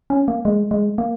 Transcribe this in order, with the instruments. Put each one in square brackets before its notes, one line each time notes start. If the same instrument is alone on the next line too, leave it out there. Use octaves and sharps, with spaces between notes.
[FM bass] C#4
A#3
G#3
G#3
A#3